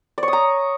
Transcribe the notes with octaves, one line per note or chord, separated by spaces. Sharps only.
D5
C#5
D#6
A#5